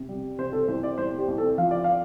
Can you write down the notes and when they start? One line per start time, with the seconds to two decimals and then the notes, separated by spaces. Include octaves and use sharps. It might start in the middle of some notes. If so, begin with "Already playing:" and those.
Already playing: C3
0.09 G3
0.38 C3 C5
0.53 A4
0.68 C2 C5
0.83 D5
0.98 C2 C5
1.18 G4
1.28 C2
1.38 A4
1.58 F3 F5
1.71 D5
1.84 F5